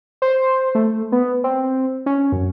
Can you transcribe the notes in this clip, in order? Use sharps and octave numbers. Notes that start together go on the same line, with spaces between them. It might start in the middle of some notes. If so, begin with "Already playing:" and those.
C5
A3
B3
C4
C#4
F#2